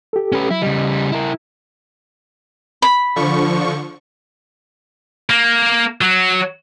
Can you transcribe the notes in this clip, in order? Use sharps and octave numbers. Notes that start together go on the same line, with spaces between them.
G4 A4
C#4 B4
F#3 E4
C#3 G3 D#5
E4 A#4
B5
D3 F3 C#6
A#3
F#3